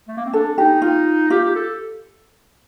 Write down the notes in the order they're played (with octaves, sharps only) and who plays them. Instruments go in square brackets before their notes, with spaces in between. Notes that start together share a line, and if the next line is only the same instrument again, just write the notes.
[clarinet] A3
A#3
C4
[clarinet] D4 [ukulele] A4
[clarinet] D#4 [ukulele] G4
[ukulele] F4
[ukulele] F4 [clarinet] G4
[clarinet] G4
A4